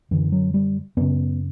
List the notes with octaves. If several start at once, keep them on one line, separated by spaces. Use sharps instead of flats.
F#2 D3 E3
F#3
G3
F#2 C#3 B3